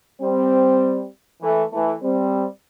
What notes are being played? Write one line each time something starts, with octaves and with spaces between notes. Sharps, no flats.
G3 C4
E3 A3
E3 A3
G3 C4